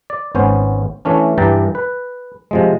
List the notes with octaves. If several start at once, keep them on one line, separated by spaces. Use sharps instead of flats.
D5
G#1 B3 C#4 C5
E3 A3 C#4 D4
G2 E3 D4 G5 A5 A#5
B4
C3 F3 G#3